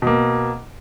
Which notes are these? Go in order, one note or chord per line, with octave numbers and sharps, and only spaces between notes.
B2 A#3